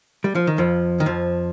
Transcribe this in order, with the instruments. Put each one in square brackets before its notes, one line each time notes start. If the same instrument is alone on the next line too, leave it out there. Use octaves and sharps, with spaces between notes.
[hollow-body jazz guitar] G3
F3
D#3
F2 F3
D#3
F2 F3